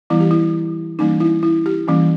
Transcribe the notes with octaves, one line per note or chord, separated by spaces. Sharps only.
E3 G3 B3 E4
G4
E4
E3 G3 A#3 C#4 D#4
E4
E4
G4
E3 G3 A#3 C#4